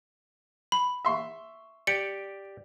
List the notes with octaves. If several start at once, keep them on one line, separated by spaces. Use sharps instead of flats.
B5
E5 C6 C#6
G4 D5 C#7